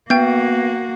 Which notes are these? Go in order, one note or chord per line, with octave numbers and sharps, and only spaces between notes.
A#3 B3 F#4 G5 G6